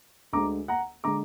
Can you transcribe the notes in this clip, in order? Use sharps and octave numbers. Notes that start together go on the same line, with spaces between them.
D2 D3 G#3 A#5 D6
F#5 A#5
D3 G#3 A#5 D6